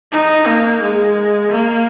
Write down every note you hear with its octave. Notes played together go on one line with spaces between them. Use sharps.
D#4
A#3
G#3
A#3